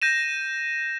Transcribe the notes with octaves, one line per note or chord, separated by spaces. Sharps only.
G6 A#6 D#7 E7